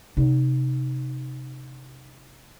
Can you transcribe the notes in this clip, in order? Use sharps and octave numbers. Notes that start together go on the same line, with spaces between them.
C3 D#4